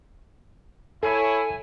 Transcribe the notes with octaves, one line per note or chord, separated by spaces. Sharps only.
E4 A4 C#5 G#5